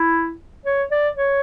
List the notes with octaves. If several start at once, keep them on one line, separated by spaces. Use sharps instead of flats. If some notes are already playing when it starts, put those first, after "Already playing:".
Already playing: E4
C#5
D5
C#5